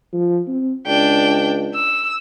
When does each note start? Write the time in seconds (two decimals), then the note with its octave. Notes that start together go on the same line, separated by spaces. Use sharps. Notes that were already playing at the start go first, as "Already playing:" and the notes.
0.13 F3
0.47 C4
0.86 C#2 D4 G5
1.74 E6